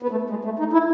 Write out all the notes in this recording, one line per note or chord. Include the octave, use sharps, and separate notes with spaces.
B3
A3
G#3
A3
D#4
E4